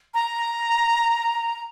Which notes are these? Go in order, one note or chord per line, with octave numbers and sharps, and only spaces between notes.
A#5